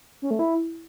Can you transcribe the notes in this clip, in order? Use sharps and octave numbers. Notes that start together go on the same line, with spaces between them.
C#4
A3
E4